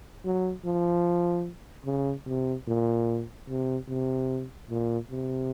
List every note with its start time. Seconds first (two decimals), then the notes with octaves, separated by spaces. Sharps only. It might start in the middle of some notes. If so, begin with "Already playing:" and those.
0.24 F#3
0.65 F3
1.86 C#3
2.26 C3
2.67 A#2
3.49 C3
3.88 C3
4.70 A#2
5.11 C3